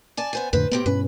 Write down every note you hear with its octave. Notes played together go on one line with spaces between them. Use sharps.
D5 G#5 A5
B3 C5 G#5
F2 A2 D3 B4 C5
A2 B3 C4 G4
G2 B2 C#4 B4